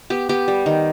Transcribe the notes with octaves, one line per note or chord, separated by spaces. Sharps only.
B3 G4
B3 G4
G3
D#3